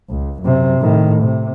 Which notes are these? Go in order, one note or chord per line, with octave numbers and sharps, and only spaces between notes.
C#2
F#2 C3
A2 D#3
C3